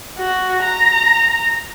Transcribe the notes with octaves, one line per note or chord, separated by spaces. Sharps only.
F#4
A#5